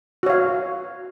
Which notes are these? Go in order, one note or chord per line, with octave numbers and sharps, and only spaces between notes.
F#4 C#5 F5